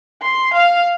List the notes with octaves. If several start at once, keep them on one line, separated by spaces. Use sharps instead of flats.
C6
F5